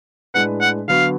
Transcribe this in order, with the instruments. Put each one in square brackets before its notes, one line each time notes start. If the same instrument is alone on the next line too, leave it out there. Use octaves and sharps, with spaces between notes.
[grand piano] A2 G#3 D4 G#4 B4 [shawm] F#5
[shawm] F#5
[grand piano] D3 F#3 B3 F#4 B4 [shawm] F5